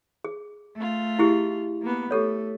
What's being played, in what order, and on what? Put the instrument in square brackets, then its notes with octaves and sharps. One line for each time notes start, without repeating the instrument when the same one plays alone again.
[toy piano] G#4
[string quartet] A3 F4
[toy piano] E4 G4 G#4
[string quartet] A#3 B3
[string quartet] A3 [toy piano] G4 A4 C#5